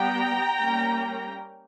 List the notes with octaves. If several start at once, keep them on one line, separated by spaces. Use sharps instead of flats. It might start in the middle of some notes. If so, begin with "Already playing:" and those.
Already playing: G3 B3 G5 A#5
G3 A#3 C#4